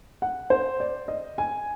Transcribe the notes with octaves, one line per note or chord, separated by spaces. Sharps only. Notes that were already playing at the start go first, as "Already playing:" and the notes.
F#5
C5
D5
D#5
G#5